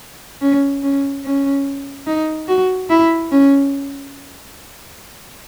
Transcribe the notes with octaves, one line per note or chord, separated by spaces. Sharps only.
C#4
C#4
C#4
D#4
F#4
E4
C#4